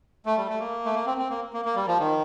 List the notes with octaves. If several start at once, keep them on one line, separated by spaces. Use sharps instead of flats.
A3
G3
A3
A#3
A3
A#3
C4
C4
A#3
A#3
A#3
G3
F3
D#3